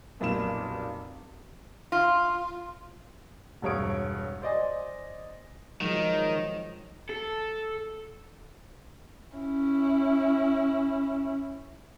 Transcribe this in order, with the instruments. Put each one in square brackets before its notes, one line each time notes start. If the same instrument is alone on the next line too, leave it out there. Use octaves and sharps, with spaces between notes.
[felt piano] F1 B1 A#2 B5 E7
[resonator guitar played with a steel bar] F4
[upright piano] E1 C2 G2 C#5 D#6 D7
C5 D5 D#5 G#5
[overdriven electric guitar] D#3 [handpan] F3 F#3 G#3
[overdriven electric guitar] A4
[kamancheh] C#4 E4